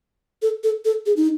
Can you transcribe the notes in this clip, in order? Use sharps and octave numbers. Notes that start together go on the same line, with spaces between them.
A4
A4
A4
G#4
D#4